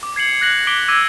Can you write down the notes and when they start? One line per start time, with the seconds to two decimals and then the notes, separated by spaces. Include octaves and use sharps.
0.03 D6
0.16 G#6 C7 C#7 F#7
0.41 F#6 A#6 F#7
0.67 D6 B6 D7 G7
0.88 D6 E6 G#6 A#6 D#7